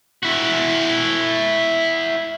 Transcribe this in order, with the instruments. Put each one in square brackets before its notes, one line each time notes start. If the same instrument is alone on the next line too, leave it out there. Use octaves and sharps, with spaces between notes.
[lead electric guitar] E4 F#4